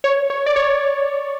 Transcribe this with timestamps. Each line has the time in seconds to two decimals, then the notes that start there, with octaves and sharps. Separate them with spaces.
0.04 C#5
0.30 C#5
0.46 D5
0.56 C#5